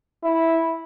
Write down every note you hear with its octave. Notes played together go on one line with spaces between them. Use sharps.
E4